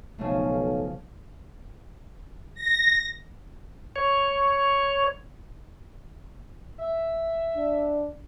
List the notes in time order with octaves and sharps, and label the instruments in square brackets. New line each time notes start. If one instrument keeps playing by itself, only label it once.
[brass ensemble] B1 [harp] C#3 F3 A3
[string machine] A#6
[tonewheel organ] C#5
[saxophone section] E5
[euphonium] D4